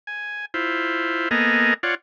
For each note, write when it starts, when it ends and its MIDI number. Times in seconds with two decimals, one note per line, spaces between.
0.07 0.45 80
0.54 1.29 64
0.54 1.29 65
0.54 1.29 72
1.31 1.74 58
1.31 1.74 59
1.31 1.74 69
1.31 1.74 75
1.31 1.74 80
1.31 1.74 82
1.83 1.95 65
1.83 1.95 73
1.83 1.95 74
1.83 1.95 78